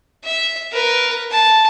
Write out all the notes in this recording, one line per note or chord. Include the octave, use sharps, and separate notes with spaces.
E5
A#4 B4
A5